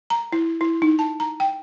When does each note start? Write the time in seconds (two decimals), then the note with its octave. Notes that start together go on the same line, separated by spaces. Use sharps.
0.10 A#5
0.33 E4
0.61 E4
0.82 D#4
0.99 A5
1.20 A#5
1.40 G5